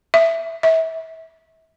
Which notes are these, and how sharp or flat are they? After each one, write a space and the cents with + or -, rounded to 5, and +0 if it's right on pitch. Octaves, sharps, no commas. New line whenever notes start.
E5 +0
E5 -30